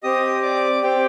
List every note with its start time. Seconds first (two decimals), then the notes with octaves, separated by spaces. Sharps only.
0.03 C4 G4 D#5 D#6
0.43 D5 D6
0.83 C4 G4 G5